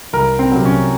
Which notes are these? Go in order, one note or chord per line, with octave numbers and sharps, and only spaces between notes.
C2 A#4
C4
C3 F#3
C#4